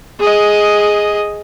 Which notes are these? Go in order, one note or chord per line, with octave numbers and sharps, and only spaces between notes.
G#4 D#5